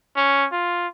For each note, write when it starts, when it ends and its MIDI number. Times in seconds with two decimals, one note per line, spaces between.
0.16 0.47 61
0.52 0.87 65